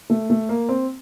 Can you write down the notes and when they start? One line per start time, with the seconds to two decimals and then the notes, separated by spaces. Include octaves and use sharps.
0.10 A3
0.30 A3
0.49 A#3
0.69 C4